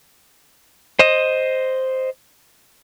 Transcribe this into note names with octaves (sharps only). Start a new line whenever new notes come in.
C5 D#5